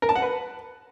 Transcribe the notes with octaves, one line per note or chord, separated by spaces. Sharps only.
A#4
A5
F#5
B4